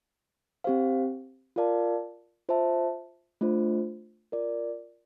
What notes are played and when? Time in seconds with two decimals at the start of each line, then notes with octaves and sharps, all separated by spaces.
0.64 C4 G4 C5 F5
1.56 F4 A#4 D5 F5 A5
2.49 F4 C5 E5 A5
3.41 A3 D4 F4 C5
4.32 F4 A#4 D5